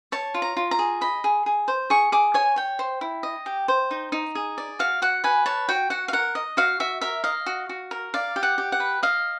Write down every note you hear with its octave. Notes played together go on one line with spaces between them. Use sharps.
C#5 A5
F4
A#5
F4
A#5
G#4
D#5 B5
G#4
G#4
C5
G#4 C#6
G#4 D6
C#5 G#5
C#5 G5
C5
E4
D#5
G4
C5
D#4
D#4
G#4
D5
F#4 F5
F#4 F#5
B4 G#5
C#5 A5
F#4 G5
F#4 F#5
F5
A#4 F#5
D#5
F#4 F5
F#4 E5
A#4 E5
D#5 F5
F#4
F#4
A#4
D5 F5
G4
F#5
G4
F#5
B4
D#5 F5